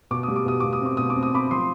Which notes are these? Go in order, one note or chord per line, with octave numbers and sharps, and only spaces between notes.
B2 D6
G3 D#6
D6
B2 D#6
B2 D6
D#6
C4 D6
B2 D#6
D6
C4
D#6
C4 B5 D6
F3 C6 D#6